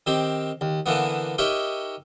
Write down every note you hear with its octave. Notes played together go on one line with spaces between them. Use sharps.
D#3 C4 G4
D#2
D3 E3 A#3 B3
D#4 G4 A#4 C#5 E5